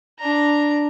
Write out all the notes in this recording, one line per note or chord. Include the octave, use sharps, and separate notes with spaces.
D4 A#5